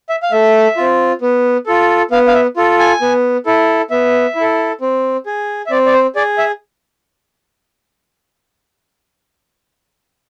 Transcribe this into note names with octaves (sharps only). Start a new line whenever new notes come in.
E5
F5
A3 E5
C4 F4
B3
F4 A4
B3 F5
F5
E5
F4 A4
G#5
B3
E4 A4
B3 E5
E4
A4
C4
G#4
E5
C4 D5
D5
C5
G#4 D5
E5